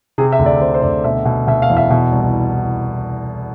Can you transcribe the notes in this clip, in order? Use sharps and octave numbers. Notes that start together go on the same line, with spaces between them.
C3 G#4
E5
D2
D5
C3 C5
C5
D2 D5
B2 E5
B2
B2 E5
F5
E2
E5
B2
C2